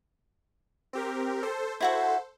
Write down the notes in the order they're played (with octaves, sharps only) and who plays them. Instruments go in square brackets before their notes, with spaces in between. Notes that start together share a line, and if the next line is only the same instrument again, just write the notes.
[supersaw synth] C4 G4 A#4
A4 C5
[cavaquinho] E4 F#4 F#5 [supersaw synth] A4 C5